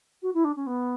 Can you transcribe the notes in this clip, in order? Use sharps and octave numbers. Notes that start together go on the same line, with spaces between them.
F#4
E4
D4
C#4
B3